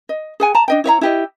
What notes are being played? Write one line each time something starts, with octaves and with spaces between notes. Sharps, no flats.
D#5
G#4 F#5 G#5
A5 A#5
D4 D#5 G5
E4 C#5 E5 A#5
E4 G4 D#5